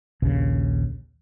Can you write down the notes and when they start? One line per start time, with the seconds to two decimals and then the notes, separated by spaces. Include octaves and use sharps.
0.22 A#1 D#2 C#3